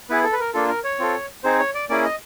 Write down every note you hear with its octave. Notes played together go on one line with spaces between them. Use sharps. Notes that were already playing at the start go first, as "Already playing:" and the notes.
B3 E4 G#4 B4
A4
B4
A#4
A#3 D4 F4 A4
A#4
C#5
C4 F4 A4
C4 D#4 G#4 C5
C#5
D5
A#3 C#4 E4 G#4 D5
D#5